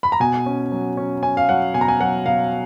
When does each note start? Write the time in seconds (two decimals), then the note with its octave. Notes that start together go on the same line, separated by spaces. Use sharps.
0.03 B5
0.12 A#5
0.20 B2 G#5
0.46 C#4
0.72 F#3
0.97 C#4
1.22 C#4 G#5
1.37 F5
1.49 F#3 F#5
1.74 B2 G#5
1.81 A#5
1.88 G#5
2.00 F#3 F#5
2.26 B2 F5